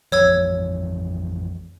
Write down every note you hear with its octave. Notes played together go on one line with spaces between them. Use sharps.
A1 F2 F3 C#5 E6 G#6